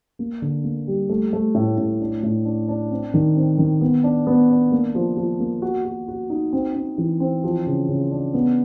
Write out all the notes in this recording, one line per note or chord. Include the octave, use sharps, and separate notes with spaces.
A#3
D3
A#3
G3
A3
A3
A2
A2
D4
A2
D4
D4
C4
D#3
C4
D#3
B3
D4
B3
D4
A#3
F3
F3
A#3
F#4
F#4
F#4
D#4
C4
C4
E3
C4
F3
C#3
C#3
D4
B3